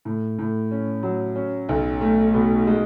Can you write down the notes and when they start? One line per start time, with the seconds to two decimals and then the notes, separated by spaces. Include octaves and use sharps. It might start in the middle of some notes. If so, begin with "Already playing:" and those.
0.05 A2
0.39 A2
0.71 C#4
1.03 F#3
1.36 C#4
1.69 B1
2.01 A3
2.34 B2
2.67 G#3